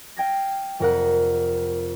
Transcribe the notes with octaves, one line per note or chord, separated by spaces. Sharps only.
F5 G5 G#6 A#6
F1 F2 F3 A#4 F#5 F#6